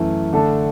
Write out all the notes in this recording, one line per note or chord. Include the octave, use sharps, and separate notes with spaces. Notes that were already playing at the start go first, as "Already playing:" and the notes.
Already playing: F#2 E3 A3
D3 A3 D4 A4